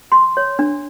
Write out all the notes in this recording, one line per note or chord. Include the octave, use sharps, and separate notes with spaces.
C6
C#5
D4